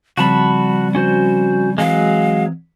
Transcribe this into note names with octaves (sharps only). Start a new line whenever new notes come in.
C#3 F3 G3 C4 F#4 A5 B5
C#4 F#4 C5
E3 F#3 G#3 C4 F5